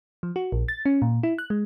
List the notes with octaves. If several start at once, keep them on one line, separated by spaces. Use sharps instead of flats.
F3
F#4
A#1
A6
C#4
A#2
E4
F#6
G#3